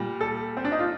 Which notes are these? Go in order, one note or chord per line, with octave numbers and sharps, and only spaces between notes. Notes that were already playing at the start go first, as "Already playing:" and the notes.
Already playing: A#2 G3
A4
C4
D4
D#4
F4